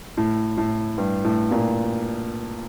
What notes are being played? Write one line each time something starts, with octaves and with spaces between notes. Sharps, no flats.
A2
A2
G2
A2
A#2